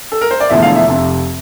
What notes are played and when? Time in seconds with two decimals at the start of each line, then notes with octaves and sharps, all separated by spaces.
0.12 A4
0.21 A#4
0.31 C5
0.40 D5
0.50 E1 E2 D3 F3 A3 E5
0.62 F5
0.75 E5
0.88 F1 F2 C3